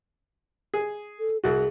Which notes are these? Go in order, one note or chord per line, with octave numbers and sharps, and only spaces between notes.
G#4
A4
C2 F#4 G#4